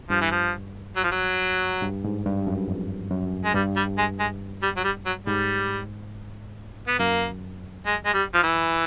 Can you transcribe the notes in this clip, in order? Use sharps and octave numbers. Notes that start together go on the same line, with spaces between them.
G2 F3
E3
F3
F#3
F3
F#3
G2
G#2
G2
F#2
F2
F#2
G#3
G2 G3
G3
G#3
G#3
G3
F#3
G3
F#3
G#2 G3
B3
F#2 A#3
G#3
G#3
G3
F3
E3